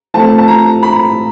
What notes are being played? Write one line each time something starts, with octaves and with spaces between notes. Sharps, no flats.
F3 A3 C4 F4 A5
A5
A#5
B5